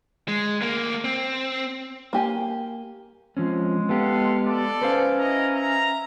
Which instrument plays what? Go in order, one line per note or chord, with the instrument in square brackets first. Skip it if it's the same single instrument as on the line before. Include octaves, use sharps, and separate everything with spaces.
[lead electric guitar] G#3
D2 A#3
C4
[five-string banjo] A#3 G4 G#5
[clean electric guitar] F3 C4 C#4 [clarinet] G#3
[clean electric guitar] B3 G4 [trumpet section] A4 F5 F#5
[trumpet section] A4 D5
[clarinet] C#4 [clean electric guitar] B4 C5 F5
[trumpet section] E4 D#5 A#5
E5 A#5